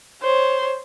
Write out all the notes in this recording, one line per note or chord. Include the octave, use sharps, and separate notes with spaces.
C5 C#5